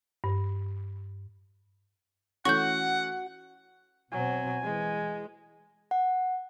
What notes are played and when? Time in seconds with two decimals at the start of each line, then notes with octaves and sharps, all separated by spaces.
0.24 G2
2.45 E3 A3 C#4 F#4 F#5 C#6 G6
4.12 B2 F#3 C4 G#5
4.63 E3 G#3
5.91 F#5